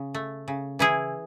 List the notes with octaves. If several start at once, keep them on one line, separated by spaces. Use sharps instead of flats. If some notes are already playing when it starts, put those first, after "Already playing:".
Already playing: C#3
A3
C#3
E3 E4 G#4